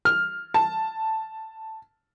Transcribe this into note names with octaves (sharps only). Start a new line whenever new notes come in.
F6
A5